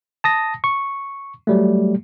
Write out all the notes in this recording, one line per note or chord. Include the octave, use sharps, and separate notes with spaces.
A5 D#6 A#6
C#6
F#3 G3 A3